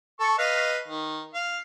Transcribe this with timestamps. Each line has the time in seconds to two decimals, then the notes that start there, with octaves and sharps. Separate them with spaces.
0.20 A4 C#6
0.38 B4 D#5 F5
0.88 D#3
1.34 F5